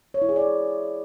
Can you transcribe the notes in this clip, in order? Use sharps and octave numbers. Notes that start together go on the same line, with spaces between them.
C#5
E4
G#4
D5